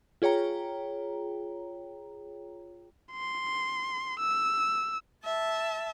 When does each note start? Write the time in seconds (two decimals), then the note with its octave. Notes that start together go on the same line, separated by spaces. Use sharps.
0.22 F4 G#4 C#5 G5 A#5
3.12 C6
4.19 E6
5.25 E5 A5